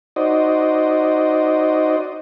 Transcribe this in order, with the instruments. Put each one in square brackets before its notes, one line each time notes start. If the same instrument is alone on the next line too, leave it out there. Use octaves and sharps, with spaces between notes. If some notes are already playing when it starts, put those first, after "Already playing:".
[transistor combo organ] D#4 F#4 C5 D5 D#5